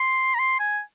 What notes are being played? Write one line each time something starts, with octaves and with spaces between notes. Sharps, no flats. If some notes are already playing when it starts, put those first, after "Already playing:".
Already playing: C6
A#5
C6
G#5